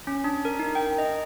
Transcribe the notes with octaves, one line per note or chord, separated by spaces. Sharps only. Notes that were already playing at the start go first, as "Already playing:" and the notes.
C#4
D4
A#4
D#4
G5
D#5